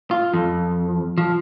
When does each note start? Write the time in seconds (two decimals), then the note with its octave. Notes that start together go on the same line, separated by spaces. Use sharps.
0.11 F4
0.33 F2
1.18 F3